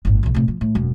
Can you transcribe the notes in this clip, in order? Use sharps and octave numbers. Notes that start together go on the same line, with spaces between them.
G1 A2
B1 E2
A2 C3
F3
A2
E1 F#2